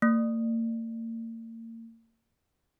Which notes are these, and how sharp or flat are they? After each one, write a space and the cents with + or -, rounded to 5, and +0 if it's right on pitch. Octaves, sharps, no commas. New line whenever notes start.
A#3 -40